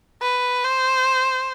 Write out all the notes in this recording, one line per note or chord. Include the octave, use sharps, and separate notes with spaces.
B4
C5